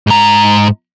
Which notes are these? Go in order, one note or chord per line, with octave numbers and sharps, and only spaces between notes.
G#2 A#5